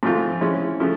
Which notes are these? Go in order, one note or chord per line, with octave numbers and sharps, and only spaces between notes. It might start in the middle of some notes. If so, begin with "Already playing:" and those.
G#2 F3 A3 C4 F4
G#3 C#4 E4
C#3 F3 A3